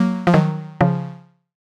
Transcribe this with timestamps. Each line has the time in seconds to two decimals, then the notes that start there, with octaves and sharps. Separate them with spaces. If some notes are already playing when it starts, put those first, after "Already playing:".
Already playing: F#3 A#3
0.27 F3
0.34 D#3 F#3
0.81 C#3 F3